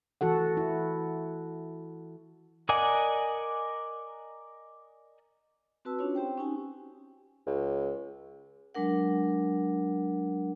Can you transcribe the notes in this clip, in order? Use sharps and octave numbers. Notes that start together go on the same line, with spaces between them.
E3 F#4 A4 F#5
E4
A#4 D5 D#5 F#5 G#5
C4 F#4 B4 A5 E6
C#4 D4 F4 F#4 C#5
C4 G4 C5 G5
C#4 D#4 G4 G#5
C#2
F#3 G#3 D4 A#4 F#5